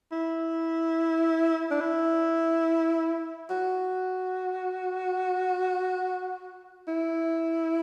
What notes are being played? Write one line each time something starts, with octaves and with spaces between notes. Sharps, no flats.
E4
D4
E4
F#4
E4